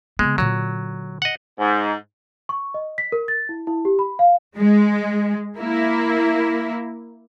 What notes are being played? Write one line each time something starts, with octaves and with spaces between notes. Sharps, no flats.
C#3 G#3 B3
A#2 D3 F#3
D#5 F#5
G#2
C#6
D#5
B6
A#4
A6
E4
E4
G4
B5
F5
G#3
A#3 E4